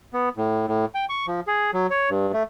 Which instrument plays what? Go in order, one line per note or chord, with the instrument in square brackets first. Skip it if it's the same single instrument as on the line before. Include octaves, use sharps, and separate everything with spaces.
[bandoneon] B3
A2
A2
G5
C#6
F3
G#4
F#3
C#5
G2
A3